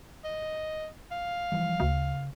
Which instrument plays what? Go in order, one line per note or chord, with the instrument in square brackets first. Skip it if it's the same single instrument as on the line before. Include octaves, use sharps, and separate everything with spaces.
[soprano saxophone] D#5
F5
[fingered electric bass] E3 F3 G3
[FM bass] D2 [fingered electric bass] C#3